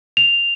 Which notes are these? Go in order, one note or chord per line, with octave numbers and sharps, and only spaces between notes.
F7